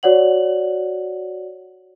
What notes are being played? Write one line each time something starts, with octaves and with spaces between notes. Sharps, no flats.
F#4 C#5 D5 F#5 F#7